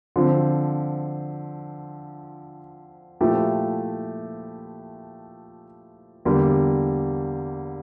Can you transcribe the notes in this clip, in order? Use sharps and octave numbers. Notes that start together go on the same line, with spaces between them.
D3 F3 C4
A#2 F3 A3 E4 G4
E2 D3 G3 A#3